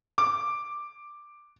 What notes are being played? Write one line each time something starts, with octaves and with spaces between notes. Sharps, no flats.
D6